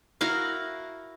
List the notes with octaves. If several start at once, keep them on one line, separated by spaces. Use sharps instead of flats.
E4 F#4 A#4 F5